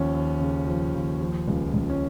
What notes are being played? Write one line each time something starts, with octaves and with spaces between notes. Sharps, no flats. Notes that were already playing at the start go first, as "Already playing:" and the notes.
Already playing: D#2 F3 C#4
D#2
C#3
F3
D#2
F3
C#2
C#2
C#4